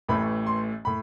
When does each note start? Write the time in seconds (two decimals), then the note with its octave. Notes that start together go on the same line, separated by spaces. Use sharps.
0.08 A1 A2 E3 A3 B5
0.46 C6
0.85 A2 B5